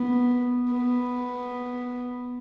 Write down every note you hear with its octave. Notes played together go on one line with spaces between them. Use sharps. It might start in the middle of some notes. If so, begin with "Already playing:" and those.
Already playing: B3
B3